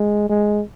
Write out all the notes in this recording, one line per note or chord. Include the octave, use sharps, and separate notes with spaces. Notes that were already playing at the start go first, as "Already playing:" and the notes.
Already playing: G#3
G#3